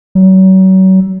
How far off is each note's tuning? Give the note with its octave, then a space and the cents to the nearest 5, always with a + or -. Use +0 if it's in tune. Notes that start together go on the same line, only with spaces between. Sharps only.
F#3 +35